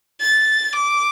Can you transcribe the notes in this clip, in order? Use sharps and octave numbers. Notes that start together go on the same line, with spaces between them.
A6
D6